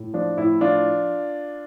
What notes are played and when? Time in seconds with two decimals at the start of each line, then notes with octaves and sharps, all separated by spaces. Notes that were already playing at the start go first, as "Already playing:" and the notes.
Already playing: A2
0.14 F3 D4
0.37 A2 E4
0.61 F3 D4 F4